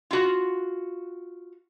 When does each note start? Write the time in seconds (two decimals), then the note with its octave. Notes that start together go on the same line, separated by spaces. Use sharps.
0.11 F4 F#4